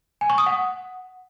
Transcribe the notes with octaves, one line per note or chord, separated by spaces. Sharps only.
G#5
C#6
D#6
F#5